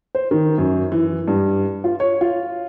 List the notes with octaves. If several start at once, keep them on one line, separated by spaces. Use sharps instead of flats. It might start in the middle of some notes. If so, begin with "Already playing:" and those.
C5
D#3
F#2
E3
G2
F4
C#5
F4